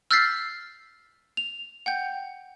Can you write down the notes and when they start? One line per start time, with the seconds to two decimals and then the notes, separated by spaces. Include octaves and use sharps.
0.11 E6 F6 G6 A6 B6 C7
1.37 F7
1.86 F#5 G5 G6